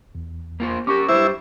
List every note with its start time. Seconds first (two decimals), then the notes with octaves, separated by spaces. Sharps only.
0.15 E2
0.60 A#3 F4 C5
0.87 C#4 G4 A#4 C#6 D6
1.09 G2 G3 E4 C5